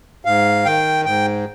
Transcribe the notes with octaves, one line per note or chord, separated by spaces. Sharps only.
G#2 F5
D#3 G5
G#2 G5